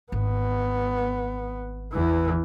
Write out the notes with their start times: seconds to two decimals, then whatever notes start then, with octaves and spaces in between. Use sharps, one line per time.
0.12 G#1 B3
1.93 E2 E3